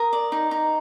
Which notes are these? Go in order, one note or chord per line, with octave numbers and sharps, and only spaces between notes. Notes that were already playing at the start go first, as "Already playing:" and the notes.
Already playing: A#4 D#6
D5
D#4
D#4